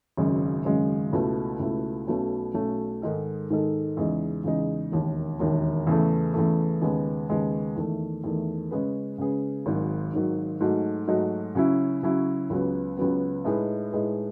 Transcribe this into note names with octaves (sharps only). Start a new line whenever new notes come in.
G#1 F#2 C#3 G#3
G#1 F#2 C#3 G#3
C#2 B2 A3 E4
C#2 B2 A3 E4
B1 B2 A3 C#4
B1 B2 A3 C#4
G#2 D#3 G#3 D#4 A4
G#2 D#3 G#3 D#4 A4
E2 C#3 G#3 D#4
E2 C#3 G#3 D#4
E1 D#2 D#3
E1 D#2 D#3
E2 C#3 E3 A3
E2 C#3 E3 A3
D#2 C#3 G#3 B3
D#2 C#3 G#3 B3
E2 D#3 A3
E2 D#3 A3
C#3 G#3 C#4 G#4 B4
C#3 G#3 C#4 G#4 B4
G#1 G#2 D#3 F#3
G#1 G#2 D#3 F#3
G#2 F#3 A3 D#4 F#4
G#2 F#3 A3 D#4 F#4
C#3 F#3 C#4 E4
C#3 F#3 C#4 E4
C#2 C#3 F#3 B3
C#2 C#3 F#3 B3
A2 G#3 D#4 G#4 B4
A2 G#3 D#4 G#4 B4